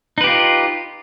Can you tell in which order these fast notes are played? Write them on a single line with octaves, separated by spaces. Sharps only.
D#4 B4 G4 F4